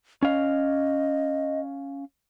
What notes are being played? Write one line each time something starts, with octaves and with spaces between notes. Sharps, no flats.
C#4 D#5 F5